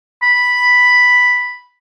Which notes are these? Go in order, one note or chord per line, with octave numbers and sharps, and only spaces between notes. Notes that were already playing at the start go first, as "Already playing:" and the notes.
B5